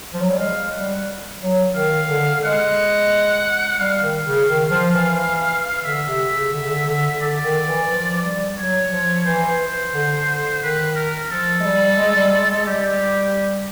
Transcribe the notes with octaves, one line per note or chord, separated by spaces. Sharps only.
F3
F#3
G3
G#3 F5
G3 F#5
F#3
D#3 F5
D3
G#3 F#5
G3 F5
D#3
C#3
D#3
F3
E3
D3 E5
C3
C#3
D3
C#3
D3
D3
D3 D5
D#3
E3
F3
G3
F#3 C#5
F3
E3 C5
D3
D#3 B4
A#4
F3 A4
G#3
G3
G#3
G3
G#3
G#3
G3 G4